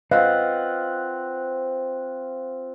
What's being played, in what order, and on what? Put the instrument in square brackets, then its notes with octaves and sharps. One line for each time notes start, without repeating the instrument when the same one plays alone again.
[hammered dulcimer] C4 F4 F#5 [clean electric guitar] B4 D#5 F5